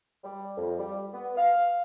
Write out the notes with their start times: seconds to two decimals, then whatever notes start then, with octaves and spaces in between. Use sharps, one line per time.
0.24 G3
0.57 F2
0.79 G3
1.13 B3
1.37 F5